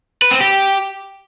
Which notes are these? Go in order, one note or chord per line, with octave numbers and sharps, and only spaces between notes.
B4
C4
G4